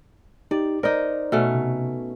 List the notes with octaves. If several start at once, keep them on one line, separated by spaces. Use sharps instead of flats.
D#4 G4 D5
D#4 A#4 C5 D5
B2 A3 C#4
C3